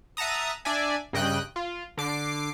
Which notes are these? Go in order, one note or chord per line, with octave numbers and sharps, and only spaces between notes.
E5 F#5 A5 A#5 D#6
D4 D5 E5 G#5
G2 C#3 D#5 G5 F#6
F4
D3 D6 C7